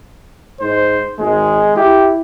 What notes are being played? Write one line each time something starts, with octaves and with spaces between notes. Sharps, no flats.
G#2 C5
G#1 G#3
E4 G4